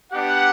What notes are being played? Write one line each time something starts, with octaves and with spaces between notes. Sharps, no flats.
B3 D4 G4 F#5